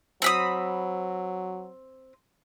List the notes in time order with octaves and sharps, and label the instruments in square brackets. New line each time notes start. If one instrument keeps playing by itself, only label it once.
[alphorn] F#3 [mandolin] C4 B5 D#6